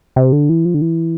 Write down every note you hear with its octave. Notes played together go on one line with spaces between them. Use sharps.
C3
D3
E3
F3
D3
E3